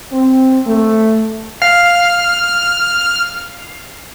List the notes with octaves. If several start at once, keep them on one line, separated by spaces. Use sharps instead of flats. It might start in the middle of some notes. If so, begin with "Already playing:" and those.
C4
A3
F5 F6